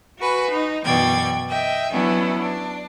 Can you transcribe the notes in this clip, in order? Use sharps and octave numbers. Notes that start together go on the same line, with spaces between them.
F#4 B4 G#5
D#4
F#2 B2 E3 D5 G5 G#6
D#5 E5 G5
F#3 B3 C#4 D4 E4
D4